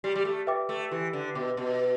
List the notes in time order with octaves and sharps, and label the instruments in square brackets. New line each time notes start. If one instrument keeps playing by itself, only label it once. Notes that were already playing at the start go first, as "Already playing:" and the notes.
[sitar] G3 [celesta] G4
[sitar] G3
A3
[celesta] B4 E5 G5 D6
[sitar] A3
[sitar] E3 [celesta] G4
[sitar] D3
[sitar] B2 [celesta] B4 E5 G5 D6
[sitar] B2
[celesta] B4